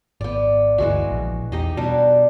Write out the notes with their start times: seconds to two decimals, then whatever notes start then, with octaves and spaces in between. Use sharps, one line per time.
0.21 G#1 B3 D5
0.78 G1 D2 E3 G#3 F#4
1.11 A#1
1.52 E2 D#4 G4 D#5
1.77 B2 F#3 G3 D4